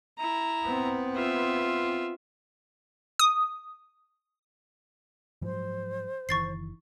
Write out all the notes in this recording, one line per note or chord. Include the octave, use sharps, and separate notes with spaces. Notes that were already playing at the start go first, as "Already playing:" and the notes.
E4 A#5
B3 C4
F4 E5
D#6
G#2 F3 F#3 C5
F#1 D#3 E3 C#6 A6 C7